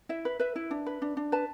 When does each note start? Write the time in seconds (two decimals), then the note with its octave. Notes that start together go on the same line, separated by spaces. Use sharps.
0.09 E4 E5
0.25 B4
0.40 B4 E5
0.56 E4
0.71 D4
0.86 B4
1.02 D4
1.17 D4
1.32 B4 A5